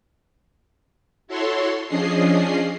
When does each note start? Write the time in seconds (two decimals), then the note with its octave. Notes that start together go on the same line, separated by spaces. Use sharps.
1.28 E4 F#4 A4 C#5 C6
1.88 F3 C#4 D4 G#4 D#5 C7